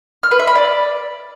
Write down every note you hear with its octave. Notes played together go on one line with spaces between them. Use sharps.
F6
B4
E5
B5
D5